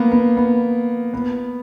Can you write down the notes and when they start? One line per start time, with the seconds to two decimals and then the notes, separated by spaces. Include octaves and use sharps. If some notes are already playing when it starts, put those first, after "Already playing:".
Already playing: A#3 B3
0.12 B3
0.37 B3
1.14 B3